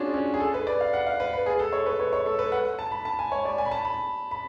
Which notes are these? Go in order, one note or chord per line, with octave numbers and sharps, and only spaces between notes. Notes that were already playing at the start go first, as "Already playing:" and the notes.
Already playing: C#4 D4 F4 F#4 G#4
C#4
G#4
A4
B4
D5
F5
F#5
F5
B4
B4
G#4
A4
C#5
B4
C#5
C#5
A4
B4
F#5
A5
B5
A5
G#5
C#5
D5
G#5
B5
A5
B5
B5